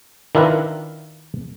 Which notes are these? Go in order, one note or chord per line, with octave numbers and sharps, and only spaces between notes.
D#3 D4 E4 F4 A#4 B4